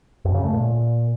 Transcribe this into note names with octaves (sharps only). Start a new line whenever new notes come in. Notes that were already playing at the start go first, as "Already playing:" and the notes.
F#2
C#3
A3
A#2